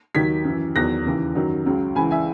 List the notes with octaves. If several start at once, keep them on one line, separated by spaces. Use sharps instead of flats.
D#2 D#3 F#3 G#6 B6
F#2 E3
E2 D#3 F#3 F#6 A#6
D#2 C#3 E3
F#2 D#3 F#3
C#2 C#3 F#3
C#2 C#3 E3 G#5 B5
E5 G#5